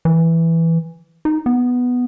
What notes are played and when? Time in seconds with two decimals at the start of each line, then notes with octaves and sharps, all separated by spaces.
0.05 E3
1.25 D#4
1.46 B3